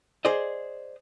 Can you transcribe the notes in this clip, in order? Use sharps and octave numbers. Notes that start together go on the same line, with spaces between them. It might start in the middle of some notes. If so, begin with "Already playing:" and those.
G#4 C5 D5 D#5